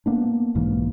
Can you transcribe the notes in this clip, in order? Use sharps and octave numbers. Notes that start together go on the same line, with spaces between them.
A#3 B3 D4
B1 G#2 E3 A#3